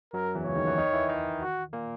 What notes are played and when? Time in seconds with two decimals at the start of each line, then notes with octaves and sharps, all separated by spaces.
0.13 F#2 F#3 A#4
0.35 E2 E3
0.46 C#2 C#3 C#5
0.56 D#2 D#3
0.67 E2 E3
0.78 D#3 D#4
0.93 E3 E4
1.09 D#3 D#4
1.42 F#4
1.73 A#2 A#3